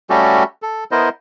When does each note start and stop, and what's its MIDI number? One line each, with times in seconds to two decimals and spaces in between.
0.10 0.43 55
0.10 0.43 57
0.10 0.43 61
0.10 0.43 66
0.10 0.43 67
0.10 0.43 69
0.62 0.84 69
0.91 1.09 59
0.91 1.09 64
0.91 1.09 70
0.91 1.09 72
0.91 1.09 75